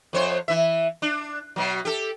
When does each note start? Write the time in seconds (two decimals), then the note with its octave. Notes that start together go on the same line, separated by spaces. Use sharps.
0.13 F2 C5 C#5
0.48 E3 E5
1.02 D4
1.56 B2 F#3
1.85 G4 A4